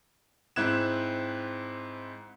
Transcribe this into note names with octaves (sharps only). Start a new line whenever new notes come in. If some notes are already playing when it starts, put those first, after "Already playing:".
G#2 C4 E4 F#6 G#6 E7